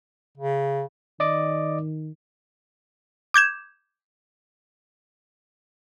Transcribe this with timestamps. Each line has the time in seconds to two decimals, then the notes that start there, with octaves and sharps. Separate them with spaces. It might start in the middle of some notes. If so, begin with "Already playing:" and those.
0.38 C#3
1.20 D#3 D5 D#5 D6
3.34 D6 G6 G#6 E7